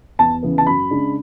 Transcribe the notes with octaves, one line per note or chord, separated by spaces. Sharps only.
E2 A5
C#3 E3 B3
A5
F#2 B5
C#3 G#3 D4